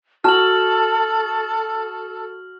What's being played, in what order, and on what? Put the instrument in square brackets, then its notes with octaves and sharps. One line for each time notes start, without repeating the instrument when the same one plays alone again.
[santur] F#4 A5 [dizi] A4 [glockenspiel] F6 F#7